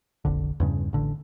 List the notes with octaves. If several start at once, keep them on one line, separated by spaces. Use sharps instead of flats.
F1 A#1 D3
E2 G2 C#3
A1 D3